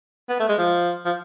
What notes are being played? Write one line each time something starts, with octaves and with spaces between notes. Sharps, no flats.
B3
A3
G#3
F3
F3